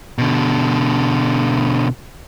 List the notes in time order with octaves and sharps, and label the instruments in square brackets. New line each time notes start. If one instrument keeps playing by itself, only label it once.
[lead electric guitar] B2 D3